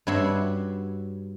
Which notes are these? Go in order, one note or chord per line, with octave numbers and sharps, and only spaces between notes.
G2 F#4 C#5 E5 B5 C6